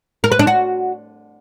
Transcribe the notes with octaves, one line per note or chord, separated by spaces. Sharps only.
A#4
B4
D4
F#4